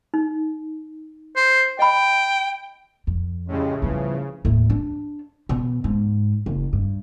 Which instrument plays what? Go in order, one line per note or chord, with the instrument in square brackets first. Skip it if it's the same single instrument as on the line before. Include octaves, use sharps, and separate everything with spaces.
[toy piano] D#4
[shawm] C5
[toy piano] D#5 B5 [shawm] G5
[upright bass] F2
[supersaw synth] A2 C#3 [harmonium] G3 G#3 C#4
[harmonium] A2 E3 F3 [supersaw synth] C#3 [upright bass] G3 B3
[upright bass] D#2 A2
D4
B2
G#2
F#1
G2